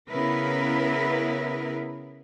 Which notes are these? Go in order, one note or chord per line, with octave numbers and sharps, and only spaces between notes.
C#3 B3 E4 A#4 B4